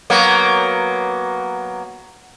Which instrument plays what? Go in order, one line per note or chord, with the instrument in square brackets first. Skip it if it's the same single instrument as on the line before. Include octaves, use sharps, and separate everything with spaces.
[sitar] F#3 A#3 B3